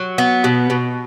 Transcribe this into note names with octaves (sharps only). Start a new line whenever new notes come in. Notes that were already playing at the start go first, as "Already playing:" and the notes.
Already playing: F#3
B3
B2
B2